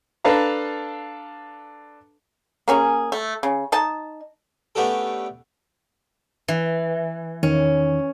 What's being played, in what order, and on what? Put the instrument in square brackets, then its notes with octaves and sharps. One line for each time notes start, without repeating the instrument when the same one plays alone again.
[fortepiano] D4 A4 B4 F5 A#5
[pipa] A#3 C#4 G#4
A3
C#3
D#4 D#5 A5
[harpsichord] A3 B3 C#4 D4 G4 A4
[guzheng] E3
[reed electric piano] E2 D#3 [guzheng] C#4